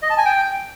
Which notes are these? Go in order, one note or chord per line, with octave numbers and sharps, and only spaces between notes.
D#5
A5
G#5
G5